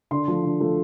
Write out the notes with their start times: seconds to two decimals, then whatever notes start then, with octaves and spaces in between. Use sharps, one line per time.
0.11 D3 C6
0.28 F3 A3
0.44 D3
0.60 F3 A3